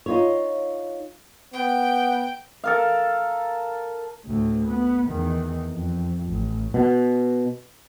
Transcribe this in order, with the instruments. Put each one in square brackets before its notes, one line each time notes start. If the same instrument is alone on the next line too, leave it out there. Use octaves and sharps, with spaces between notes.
[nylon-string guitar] D#4 F4 C#5
[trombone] B3 [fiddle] G5
[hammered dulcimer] A4 A#4 F5
[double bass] D2 A2
B3
E2 D#3
F2
A1
[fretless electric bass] B2